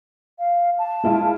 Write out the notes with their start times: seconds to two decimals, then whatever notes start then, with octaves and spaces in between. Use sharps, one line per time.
0.39 F5
0.78 A5
1.04 G#3 E4 F4